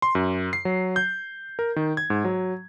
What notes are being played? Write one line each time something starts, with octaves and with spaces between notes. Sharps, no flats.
C6
F#2
C7
F#3
G6
A#4
D#3
G#6
G#2
F#3